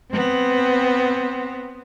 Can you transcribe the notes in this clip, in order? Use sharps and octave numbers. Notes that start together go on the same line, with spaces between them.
B3 C4